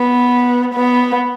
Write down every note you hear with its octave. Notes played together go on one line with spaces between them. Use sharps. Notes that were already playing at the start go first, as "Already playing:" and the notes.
Already playing: B3
B3